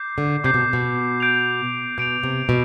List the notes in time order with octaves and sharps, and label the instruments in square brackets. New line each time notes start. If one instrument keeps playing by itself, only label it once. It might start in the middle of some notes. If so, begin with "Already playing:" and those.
Already playing: [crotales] D6 G6 C7
[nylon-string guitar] D3
[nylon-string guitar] C3 [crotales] D6 G6 C7
[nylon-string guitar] B2
B2
[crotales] G6 D7 F7
[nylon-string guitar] B2 [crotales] G6 D7 F7
[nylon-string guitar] C3
B2